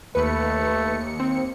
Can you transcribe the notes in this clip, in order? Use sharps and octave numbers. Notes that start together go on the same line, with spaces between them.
D#2 A3 B4 C#7
C4